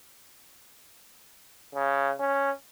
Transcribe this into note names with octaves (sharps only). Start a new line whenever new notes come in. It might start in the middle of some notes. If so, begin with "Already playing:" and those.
C#3
C#4